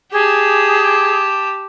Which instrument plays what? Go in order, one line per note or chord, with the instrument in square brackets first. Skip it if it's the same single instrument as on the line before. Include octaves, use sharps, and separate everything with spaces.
[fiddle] G4 A5 [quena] G#4